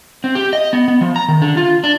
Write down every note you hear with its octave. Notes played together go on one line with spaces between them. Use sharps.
C4
G4
D#5
B3
B3
F3
A#5
D#3
D3
F4
D4